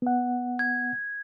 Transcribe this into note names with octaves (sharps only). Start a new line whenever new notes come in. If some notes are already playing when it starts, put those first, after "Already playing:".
B3 F#5
G#6